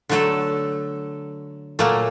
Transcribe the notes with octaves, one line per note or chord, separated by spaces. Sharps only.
D3 F#3 A3 A4
A#2 F#3 A3 A#3